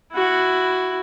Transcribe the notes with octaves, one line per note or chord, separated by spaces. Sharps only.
E4 F#4